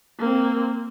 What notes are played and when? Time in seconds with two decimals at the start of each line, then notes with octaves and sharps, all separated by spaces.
0.19 A#3 C4